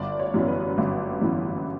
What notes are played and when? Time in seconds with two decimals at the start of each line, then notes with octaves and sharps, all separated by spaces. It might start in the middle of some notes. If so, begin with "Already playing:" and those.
Already playing: G1 D5
0.19 C#5
0.34 F#2 E3 B3
0.48 B4
0.78 G1
1.21 F#2 E3 B3